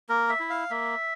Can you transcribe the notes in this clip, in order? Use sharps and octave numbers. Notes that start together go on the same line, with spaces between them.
A#3 A#4
E5
E4
F5
A#3 E5